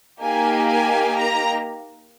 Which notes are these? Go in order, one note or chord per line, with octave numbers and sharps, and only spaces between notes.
A#3 D#4 G4 G#5
G#5
A#5